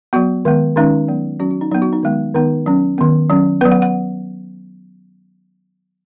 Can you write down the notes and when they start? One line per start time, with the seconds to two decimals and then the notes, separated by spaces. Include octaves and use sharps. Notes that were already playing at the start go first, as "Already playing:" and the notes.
0.13 F#3 B3 F#4
0.45 D#3 G#3 B3
0.76 D#3 G#3 C#4 D#4
1.08 F#3 B3
1.40 F#3 C#4 F#4
1.51 F#4
1.61 D#4
1.71 F#3 B3 D#4
1.82 F#4
1.93 D#4
2.03 D#3 G#3 B3
2.35 D#3 B3 D#4
2.66 F#3 C#4
2.98 D#3 B3
3.30 F#3 C#4
3.61 F#3 B3 B4
3.72 F#5
3.82 F#5